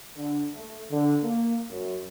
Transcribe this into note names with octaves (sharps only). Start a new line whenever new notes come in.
D3
A3
D3
A#3
F#2